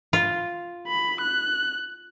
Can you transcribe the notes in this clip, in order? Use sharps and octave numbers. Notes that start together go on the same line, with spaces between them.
F4
B5
F#6